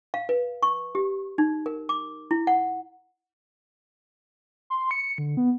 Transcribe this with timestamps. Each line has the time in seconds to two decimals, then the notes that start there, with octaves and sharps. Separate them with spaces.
0.14 F5
0.29 B4
0.63 C#6
0.95 G4
1.38 D#4
1.66 A#4
1.89 D6
2.31 E4
2.47 F#5
4.70 C6
4.91 C#7
5.18 D3
5.37 B3